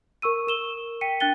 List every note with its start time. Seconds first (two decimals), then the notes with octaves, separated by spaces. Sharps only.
0.22 A#4 C#6 E6 D#7
0.47 A#4 E7 G7
1.01 G5 B6 C#7 D#7
1.20 D4 G5 F#6 A6 G7